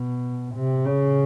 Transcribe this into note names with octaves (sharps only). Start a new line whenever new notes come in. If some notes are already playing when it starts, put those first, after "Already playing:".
Already playing: B2
C3
C#3